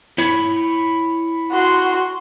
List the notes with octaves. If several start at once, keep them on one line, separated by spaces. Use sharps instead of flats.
E4 C#5
F#4 C6